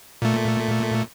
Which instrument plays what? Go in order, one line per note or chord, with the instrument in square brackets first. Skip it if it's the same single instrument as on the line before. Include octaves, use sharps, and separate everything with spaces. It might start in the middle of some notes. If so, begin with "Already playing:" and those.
[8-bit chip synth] A#2 A3